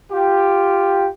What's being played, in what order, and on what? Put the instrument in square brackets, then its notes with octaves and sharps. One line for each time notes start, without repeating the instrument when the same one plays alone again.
[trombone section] F4 G4